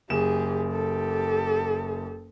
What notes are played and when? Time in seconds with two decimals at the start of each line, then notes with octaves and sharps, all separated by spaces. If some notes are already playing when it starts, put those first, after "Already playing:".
0.10 F#1 G4 G#4 E7
0.71 G4 A4